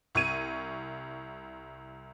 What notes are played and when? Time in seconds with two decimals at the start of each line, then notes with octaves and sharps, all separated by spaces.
0.15 C2 C#6 G#6 D#7